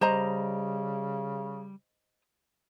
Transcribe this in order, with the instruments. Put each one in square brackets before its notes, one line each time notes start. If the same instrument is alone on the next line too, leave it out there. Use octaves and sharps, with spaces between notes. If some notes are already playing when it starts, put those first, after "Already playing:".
[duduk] C#3 [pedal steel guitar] G3 [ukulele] C5 D#5 A#5